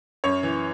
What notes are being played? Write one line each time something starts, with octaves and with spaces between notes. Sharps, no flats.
F#2 C#5
E3